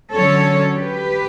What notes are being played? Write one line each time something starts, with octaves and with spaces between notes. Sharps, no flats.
D3 F#3 C#4 A4 C#5
G4 B4